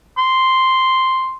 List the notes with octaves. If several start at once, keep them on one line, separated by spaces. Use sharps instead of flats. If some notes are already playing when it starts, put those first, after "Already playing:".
C6